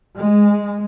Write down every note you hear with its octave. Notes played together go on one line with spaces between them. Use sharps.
G#3